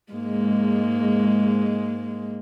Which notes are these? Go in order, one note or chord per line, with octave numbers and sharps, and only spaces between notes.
G#2 G#3 A#3